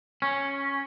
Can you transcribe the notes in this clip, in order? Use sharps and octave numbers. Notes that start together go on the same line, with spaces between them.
C#4